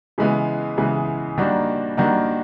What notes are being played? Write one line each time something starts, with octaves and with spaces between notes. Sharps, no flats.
C#3 E3 G#3 B3
C#3 E3 G#3 B3
D#3 G3 A#3 D4 F#4
D#3 G3 A#3 D4 F#4